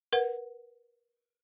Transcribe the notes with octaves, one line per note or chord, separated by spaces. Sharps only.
A#4 B4 F#5